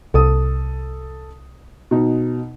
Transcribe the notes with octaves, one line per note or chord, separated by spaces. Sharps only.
C2 A4 D#6
B2 D#4